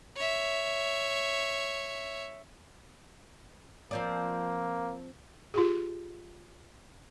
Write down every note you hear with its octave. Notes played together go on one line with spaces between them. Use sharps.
C#5 E5
F3 A#3 C4 D5
F4 G4 G#4